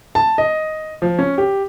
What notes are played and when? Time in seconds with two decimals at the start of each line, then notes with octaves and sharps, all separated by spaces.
0.15 A5
0.38 D#5
1.02 F3
1.19 C#4
1.38 G4